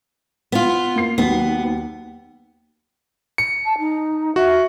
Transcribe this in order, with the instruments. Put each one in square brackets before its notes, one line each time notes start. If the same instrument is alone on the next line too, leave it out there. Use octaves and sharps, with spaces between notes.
[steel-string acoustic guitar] B3 F4
[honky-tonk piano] A#3 C7
[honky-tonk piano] D#2 F#3 [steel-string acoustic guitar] B3
[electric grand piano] C#7
[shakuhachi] A5
D#4
[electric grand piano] F#4 [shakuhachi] E5